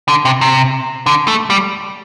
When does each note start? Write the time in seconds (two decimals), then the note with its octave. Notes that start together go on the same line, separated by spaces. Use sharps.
0.08 D3
0.25 C3
0.41 C3
1.06 D3
1.28 A3
1.50 G3